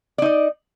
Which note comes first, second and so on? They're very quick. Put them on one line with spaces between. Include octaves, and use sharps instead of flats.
D5 D#4 D#5